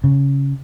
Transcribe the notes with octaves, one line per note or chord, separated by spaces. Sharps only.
C#3